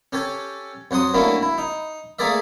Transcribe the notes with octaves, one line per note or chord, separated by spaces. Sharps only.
C#4 G4 A4 C#5
F2 F#3 F#5 C6 D#6
F#3 A3 A#3 C#4 D4 E4
E4
D#4
A3 A#3 G#4 A#4 D5 E5